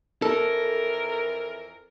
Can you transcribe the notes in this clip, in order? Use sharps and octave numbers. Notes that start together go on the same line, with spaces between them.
F2 E3 A4 A#4